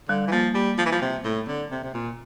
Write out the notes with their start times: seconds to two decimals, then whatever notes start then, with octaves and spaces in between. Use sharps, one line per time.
0.08 D3 G3
0.27 E3
0.32 F3 A#3
0.54 G3 A#3
0.78 F3
0.85 E3
0.92 F3
1.01 C3
1.24 A2
1.47 D3 C4
1.71 C3
1.83 C3
1.94 A#2